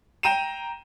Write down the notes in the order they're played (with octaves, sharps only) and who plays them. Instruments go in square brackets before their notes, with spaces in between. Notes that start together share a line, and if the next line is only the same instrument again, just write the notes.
[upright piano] G5 A#5 D#7 E7